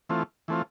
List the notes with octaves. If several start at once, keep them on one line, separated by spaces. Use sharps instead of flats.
E3 A3 C4 F4
E3 A3 C4 F4